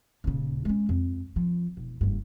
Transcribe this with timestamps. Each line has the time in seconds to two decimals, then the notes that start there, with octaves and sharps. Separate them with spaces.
0.24 D#1 C#3
0.65 G#3 C#4
0.89 F2
1.36 F3
1.77 E1
2.01 F#1 G2